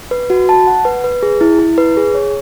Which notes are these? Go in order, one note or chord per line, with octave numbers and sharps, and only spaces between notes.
B4
F#4
A5
F#5
B4
B4
G#4
E4
E4
B4
G#4
C#5